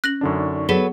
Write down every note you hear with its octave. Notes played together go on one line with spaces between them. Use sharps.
C#4 F#6 A#6 F#7
F#2 D3 D4 D#4 D5 C#6
F#3 B3 G#4 A4 B4 B6 G7